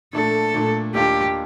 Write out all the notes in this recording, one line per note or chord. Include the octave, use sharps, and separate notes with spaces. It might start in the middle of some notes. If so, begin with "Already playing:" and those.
A#2 A3 D4 A4
A#2 A3 D4
D#2 D#3 A#3 D4 F4 G4